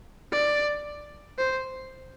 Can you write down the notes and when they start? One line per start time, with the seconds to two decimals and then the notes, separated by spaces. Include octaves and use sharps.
0.32 D5
1.38 C5